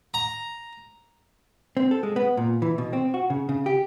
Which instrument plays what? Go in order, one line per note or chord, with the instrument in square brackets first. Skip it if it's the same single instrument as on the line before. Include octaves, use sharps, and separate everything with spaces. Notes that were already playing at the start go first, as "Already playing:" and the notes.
[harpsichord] A#5
[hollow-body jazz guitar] C4
A4
G#3
B3
A#2
E3
B2
C4
F#4
C#3
C#3
G4